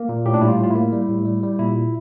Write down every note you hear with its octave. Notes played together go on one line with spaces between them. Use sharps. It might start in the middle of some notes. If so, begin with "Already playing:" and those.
Already playing: A#3
A#2
A2 G4
D4
G3 E4
F4
A2 F4
A#3 E4
G3
A2
G3
G3
A#2 E4